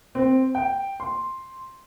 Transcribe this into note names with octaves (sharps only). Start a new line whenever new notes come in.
C4
G5
C6